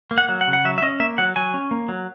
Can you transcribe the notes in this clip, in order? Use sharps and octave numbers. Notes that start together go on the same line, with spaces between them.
A#3
F#5
F#3
F#5
C#3
F#5
F#3 E5
E5
C#4 D#5
A#3 E5
F#3 F#5
F#3 G#5
C#4
A#3
F#3